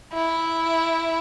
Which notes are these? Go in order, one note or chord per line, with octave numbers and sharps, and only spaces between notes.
E4